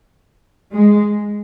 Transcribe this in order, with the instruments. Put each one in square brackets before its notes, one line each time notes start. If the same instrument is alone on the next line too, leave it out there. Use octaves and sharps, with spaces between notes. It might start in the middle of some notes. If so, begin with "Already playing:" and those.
[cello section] G#3